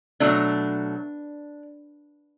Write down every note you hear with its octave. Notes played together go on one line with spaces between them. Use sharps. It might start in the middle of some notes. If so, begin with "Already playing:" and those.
B2 F#3 A3 D4